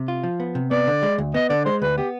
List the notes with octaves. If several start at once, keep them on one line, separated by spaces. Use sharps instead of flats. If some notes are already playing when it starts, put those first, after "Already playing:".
Already playing: C3
F4
F3
B3
C3
B3 D5
D3
G#3
D2
B3 D#5
D3 D5
G#3 C5
D2 B4
B3 G4